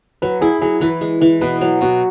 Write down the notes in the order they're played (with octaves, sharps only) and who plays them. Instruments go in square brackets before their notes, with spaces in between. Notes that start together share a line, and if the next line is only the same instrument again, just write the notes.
[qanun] F#3 [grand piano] B4
[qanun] E4 [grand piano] G#4
[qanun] F#3 [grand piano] G#4
[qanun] E3 [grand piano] B4
[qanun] G#3
[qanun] E3 [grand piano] B4
[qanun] B2 [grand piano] B4
[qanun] F#3
[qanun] B2 [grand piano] F#4